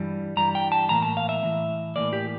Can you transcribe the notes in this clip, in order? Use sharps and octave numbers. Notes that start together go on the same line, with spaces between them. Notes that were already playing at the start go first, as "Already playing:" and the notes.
Already playing: G2 E3 G3
G2 E3 G3 A#5
G5
A5
A2 E3 A#3 A#5
A5
F5
E5
A2 E3 A#3
A2 E3 A#3 D5
G4